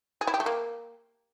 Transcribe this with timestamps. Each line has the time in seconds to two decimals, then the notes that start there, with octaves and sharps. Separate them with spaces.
0.21 G#4
0.27 E4
0.34 G4
0.40 A3
0.46 A#3